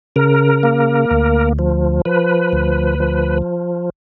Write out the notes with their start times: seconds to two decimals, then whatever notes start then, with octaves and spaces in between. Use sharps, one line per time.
0.16 C#3 A#4
0.63 A#3
1.11 D2
1.59 F3
2.05 F3 B4
2.53 D2
3.00 F3